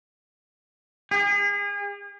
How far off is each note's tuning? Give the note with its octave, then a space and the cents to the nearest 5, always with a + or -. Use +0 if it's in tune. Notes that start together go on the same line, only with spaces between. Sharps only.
G#4 -40